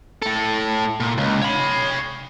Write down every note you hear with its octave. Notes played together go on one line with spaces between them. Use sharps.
A2 A4
A#2
C#2
C#5 B5